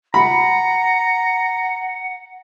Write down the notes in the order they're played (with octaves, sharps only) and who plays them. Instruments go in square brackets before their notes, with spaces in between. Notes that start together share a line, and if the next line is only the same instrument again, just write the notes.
[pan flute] F#5 [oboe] A#5 [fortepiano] B5